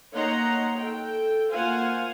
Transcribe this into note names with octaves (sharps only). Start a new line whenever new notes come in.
A#3 D#4 C#5 F#5 A#5 C6
A4 G5
A#3 F4 C5 F5 F#5 G#5